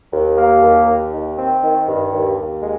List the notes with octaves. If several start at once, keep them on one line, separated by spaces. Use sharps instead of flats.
D#2
A#3
D#2
D#2
D#3
C4
D#3
G2
D#2
D#2
G#3